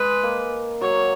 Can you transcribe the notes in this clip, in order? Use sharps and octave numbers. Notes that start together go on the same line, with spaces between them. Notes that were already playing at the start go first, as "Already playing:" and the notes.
Already playing: G#3 B4
A#3
F#3 C#5